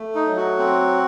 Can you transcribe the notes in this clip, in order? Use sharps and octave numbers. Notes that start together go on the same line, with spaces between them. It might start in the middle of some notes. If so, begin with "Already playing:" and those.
Already playing: A3
D#4
F#3
F#4
C4